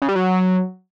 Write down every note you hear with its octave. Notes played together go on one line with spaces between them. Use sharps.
C#3
G3
F#3